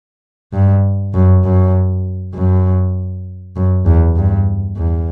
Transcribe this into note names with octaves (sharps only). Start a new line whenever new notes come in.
G2
F#2
F#2
F#2
F#2
E2
G2
E2